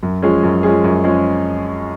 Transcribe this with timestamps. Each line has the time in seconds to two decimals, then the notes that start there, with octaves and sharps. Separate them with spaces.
0.03 F#2
0.22 F3 G#3 C#4 G#4
0.43 F#2
0.63 F3 G#3 C#4 G#4
0.84 F#2
1.04 F3 G#3 C#4 G#4